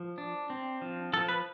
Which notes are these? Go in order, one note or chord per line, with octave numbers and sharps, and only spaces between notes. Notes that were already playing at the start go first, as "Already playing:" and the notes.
Already playing: F3
D4
C4
F3
F3 A4
B4